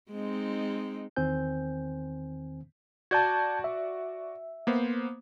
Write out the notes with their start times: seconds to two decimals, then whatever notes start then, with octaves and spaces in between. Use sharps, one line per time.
0.11 G#3 C4 D#4
1.16 E2 D#3 C4 C5 G#5 G6
3.11 F#4 D5 A5 G6 G#6
3.64 E5
4.67 A#3 B3 C5